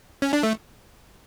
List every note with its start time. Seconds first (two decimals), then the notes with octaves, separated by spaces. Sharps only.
0.22 C#4
0.33 D4
0.43 A3